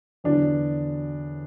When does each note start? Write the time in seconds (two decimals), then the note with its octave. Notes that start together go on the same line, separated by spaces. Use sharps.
0.24 E2 D3 F#3 D4